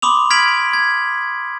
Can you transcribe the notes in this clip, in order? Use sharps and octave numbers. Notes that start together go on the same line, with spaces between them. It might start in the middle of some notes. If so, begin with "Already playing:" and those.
B5 C6 D6 D#6 F7
F6 G#6 B6 D7 F7 F#7
G#6